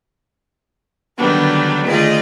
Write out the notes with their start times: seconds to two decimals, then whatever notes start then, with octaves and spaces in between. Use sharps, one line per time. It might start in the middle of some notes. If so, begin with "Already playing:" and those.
1.17 D3 D#3 F#3 G3 B3 D4
1.84 D2 D#3 F4 G#4 D5 D#5